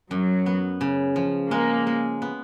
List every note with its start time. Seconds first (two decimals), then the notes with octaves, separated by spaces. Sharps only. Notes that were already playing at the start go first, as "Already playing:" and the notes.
0.11 F#2 F#3
0.46 B3
0.81 C#3
1.16 F3
1.51 G#3 A#3
1.87 G#3
2.22 B3